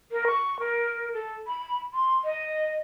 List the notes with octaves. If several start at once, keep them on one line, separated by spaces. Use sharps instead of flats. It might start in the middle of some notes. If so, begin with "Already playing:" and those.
A#4
C#6
A#4
A4
B5
C6
D#5